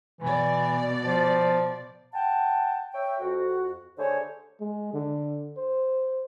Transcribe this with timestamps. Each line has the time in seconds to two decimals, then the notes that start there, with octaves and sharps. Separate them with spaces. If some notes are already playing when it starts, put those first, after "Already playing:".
0.21 B2 E3 D5
1.05 F3
2.14 F#5 G5 A5
2.94 C#5 E5 G5
3.20 F2 F#4
3.98 D3 G3 A3 G#4 C5 C#5
4.60 G#3
4.94 D3
5.57 C5